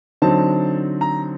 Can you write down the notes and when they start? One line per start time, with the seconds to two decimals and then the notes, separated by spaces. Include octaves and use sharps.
0.22 D3 F#3 C4 D#4 A5
1.01 A#5